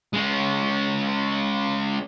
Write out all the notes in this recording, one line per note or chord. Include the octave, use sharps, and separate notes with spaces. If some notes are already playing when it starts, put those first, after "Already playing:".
G#3 C#4